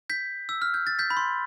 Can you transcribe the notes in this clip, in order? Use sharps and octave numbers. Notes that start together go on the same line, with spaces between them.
G6 B6
E6
F6
G6
A6
G6 B6
B5
C6